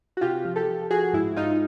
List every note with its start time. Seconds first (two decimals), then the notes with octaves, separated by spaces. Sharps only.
0.17 F#4
0.21 C3 F4 G4
0.45 F3
0.56 G4 A4
0.67 F3
0.90 F3 F#4 G#4
1.13 G#2 E4
1.36 G#2 D#4 F4